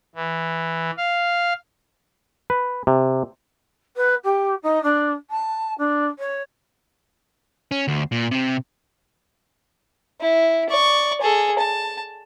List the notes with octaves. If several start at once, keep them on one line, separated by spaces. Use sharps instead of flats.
E3
F5
B4
C3
B4
G4
D#4
D4
A5
D4
C#5
C#4
D2
A#2
C3
E4
D5 C#6
G#4 A4
A5